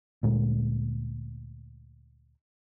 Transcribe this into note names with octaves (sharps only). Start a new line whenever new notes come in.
D2 A#2 G#3